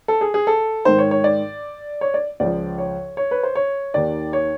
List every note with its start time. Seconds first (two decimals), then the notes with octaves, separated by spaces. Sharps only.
0.08 A4
0.21 G#4
0.34 G#4
0.47 A4
0.85 G#2 D#3 C5
0.99 C#5
1.11 C#5
1.24 D5
2.01 C#5
2.14 D5
2.40 C#2 C#3 F3 D5
2.78 C#5
3.17 C#5
3.31 B4
3.43 C5
3.55 C#5
3.94 D#2 D#3 D5
4.33 C#5